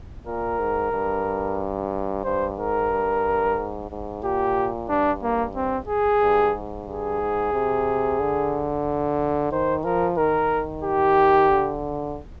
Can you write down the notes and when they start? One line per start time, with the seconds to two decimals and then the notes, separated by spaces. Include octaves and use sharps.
0.26 A#2 A#4
0.59 G#2
0.93 G2
2.24 G2 C5
2.58 G#2 A#4
2.91 G2
3.57 G#2
3.90 G#2
4.23 A#2 G4
4.89 G2 D4
5.22 A#3
5.55 C4
5.88 G#4
6.21 G2
6.54 G#2
6.87 G2 G#4
7.21 G#2
7.53 C3
8.20 D3
9.52 D#3 C5
9.85 F3 A#4
10.17 D#3 A#4
10.83 G4
11.50 D3